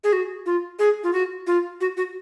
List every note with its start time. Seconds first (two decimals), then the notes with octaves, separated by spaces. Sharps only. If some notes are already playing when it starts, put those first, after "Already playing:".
0.04 G#4
0.13 F#4
0.46 F4
0.79 G#4
1.04 F4
1.13 F#4
1.47 F4
1.81 F#4
1.97 F#4